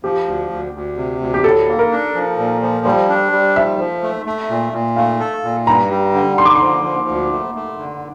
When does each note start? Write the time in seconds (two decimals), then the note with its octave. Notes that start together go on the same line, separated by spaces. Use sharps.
0.03 F3 G4
0.27 D2
0.50 D2
0.74 D2
0.97 C3
1.21 D2
1.34 G4
1.44 A2 A4
1.68 A#3
1.79 A#4
1.91 D4
2.15 F3
2.38 A#2
2.62 F3
2.85 G3 C5
3.09 D4
3.32 G3
3.56 F3 E5
3.79 F3
4.03 A3
4.26 A3
4.50 A#2
4.73 A#2
4.96 A3 F5
5.20 A4
5.44 A#2
5.67 G2 A#5
5.90 G3
6.14 D3
6.38 D3 C6
6.46 D6
6.55 C6
6.61 F3
6.84 F3
7.08 D2
7.31 A3
7.55 A3
7.78 D3